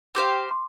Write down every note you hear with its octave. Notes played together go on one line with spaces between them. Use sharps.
C4 G4 C5 F5 D6
C6